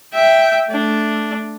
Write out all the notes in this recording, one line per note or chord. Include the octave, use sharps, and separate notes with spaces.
E5 G5
A3 D4